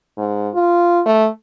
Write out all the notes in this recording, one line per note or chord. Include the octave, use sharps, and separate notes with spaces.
G#2
F4
A3